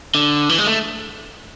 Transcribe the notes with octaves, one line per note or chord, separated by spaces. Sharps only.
D3
E3
G#3
A3